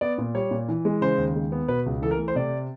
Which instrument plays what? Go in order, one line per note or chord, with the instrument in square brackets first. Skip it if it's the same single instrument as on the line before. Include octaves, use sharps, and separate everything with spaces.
[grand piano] B3 D5
A#2
G3 C#5
A#2
E3
G#3
C#3 C5
D#2
G#3
B3
B2 B4
C#2
E3 A4
A#4
A3
C5
C3 D5